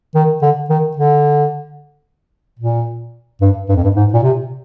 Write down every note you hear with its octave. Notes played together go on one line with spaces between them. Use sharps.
D#3
D3
D#3
D3
A#2
G2
G2
F2
G2
G#2
A#2
C3